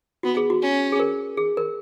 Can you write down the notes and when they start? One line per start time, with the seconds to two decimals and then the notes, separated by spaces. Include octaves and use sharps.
0.23 B3 F#4
0.37 G#4
0.50 F#4
0.62 C#4
0.92 G#4
1.00 A#4
1.37 G#4
1.57 A#4